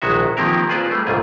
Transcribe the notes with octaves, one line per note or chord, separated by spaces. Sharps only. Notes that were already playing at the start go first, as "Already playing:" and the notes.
A#1 D#3 G#3 F#4 E5
D#3 F3 A#3 C4 G4 A#4
F4 G#4 B4 C5 D5
G3 A3
G1 C2 G#2 F4 G#4